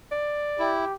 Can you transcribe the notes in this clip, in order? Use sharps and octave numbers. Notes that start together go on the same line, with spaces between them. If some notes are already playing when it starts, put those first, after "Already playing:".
D5
E4 G4